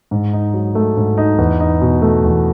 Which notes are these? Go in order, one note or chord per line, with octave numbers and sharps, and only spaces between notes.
G#2
D#4
F#3
A3
G#2
D#4
E2
D#4
B2
A3
E2